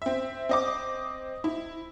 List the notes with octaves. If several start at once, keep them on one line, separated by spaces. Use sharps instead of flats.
C4 E5
C4 D#5 D6
E4